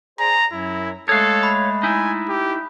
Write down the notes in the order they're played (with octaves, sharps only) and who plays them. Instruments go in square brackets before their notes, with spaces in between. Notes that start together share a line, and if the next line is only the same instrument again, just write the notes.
[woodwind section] G#4 C5 D5 [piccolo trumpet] A#5
[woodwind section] F#2 F#3 [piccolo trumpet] E4
[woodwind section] G#3 A3 [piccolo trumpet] A4 [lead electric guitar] C#5 F5 [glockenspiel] D#6 F#6
[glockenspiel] B5
[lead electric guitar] D#4 E4 [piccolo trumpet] G#5
[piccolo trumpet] G4